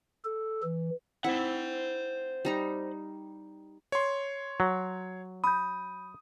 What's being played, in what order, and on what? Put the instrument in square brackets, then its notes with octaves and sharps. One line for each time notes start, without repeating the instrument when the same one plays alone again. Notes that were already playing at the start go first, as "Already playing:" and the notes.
[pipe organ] A4
E3
[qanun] C4 E4 [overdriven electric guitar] C5 F#5
[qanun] G3 D#4 A#5
[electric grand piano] C#5 C6
[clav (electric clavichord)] F#3
[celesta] B5 G6 [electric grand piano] D#6